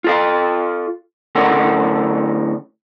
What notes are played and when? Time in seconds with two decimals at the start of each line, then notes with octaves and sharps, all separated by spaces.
0.04 F4 A4 F5
1.35 A2 D3 C#4 A4 A#4 F#5